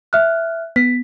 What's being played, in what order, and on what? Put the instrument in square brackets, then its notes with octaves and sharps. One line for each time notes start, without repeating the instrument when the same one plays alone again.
[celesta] E5 F6 F#6
[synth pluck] B3 [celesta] B6